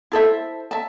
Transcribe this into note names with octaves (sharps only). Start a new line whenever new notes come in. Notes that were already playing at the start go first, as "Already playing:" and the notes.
E4 A4 C5 E5
E5 A5